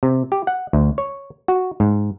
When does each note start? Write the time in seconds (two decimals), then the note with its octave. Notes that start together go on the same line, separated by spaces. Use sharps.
0.03 C3
0.32 G4
0.47 F#5
0.73 D2
0.98 C#5
1.48 F#4
1.80 G#2